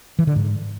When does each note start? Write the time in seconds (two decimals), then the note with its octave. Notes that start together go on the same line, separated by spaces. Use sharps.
0.19 E3
0.27 D3
0.36 G#2